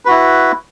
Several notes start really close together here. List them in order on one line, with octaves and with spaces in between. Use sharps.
B4 F#4 E4